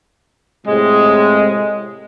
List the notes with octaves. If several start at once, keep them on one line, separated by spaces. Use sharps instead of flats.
A2 C3 G#3